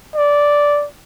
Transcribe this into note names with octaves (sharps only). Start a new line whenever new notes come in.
D5